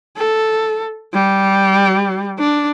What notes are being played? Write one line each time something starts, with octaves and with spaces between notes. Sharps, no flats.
A4
G3
D4